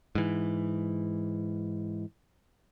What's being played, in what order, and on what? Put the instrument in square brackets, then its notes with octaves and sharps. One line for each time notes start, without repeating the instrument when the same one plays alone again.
[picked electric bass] G#2 E3